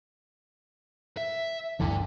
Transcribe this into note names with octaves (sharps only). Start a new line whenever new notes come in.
E5
G1 D2 D3 E3